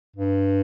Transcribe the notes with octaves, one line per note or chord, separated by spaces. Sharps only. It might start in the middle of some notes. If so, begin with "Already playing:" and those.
G2